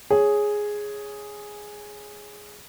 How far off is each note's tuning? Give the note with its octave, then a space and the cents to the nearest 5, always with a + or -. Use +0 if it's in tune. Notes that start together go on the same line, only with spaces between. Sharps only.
G#4 +0 C#5 +0